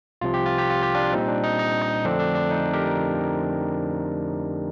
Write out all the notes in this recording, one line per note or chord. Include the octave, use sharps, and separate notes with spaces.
C2 C3 F3 F4
G4
F4
G4
F4
G4
D4 F4
A#2 G3 C4 D#4
D4
D#4
D#4
D#4
F2 D3 F3 A3 C4 D4
D4
D4
D#4
G4 A#4